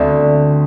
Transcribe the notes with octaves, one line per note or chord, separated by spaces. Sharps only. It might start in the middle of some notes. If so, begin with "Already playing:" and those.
Already playing: D2 D3 A3 C4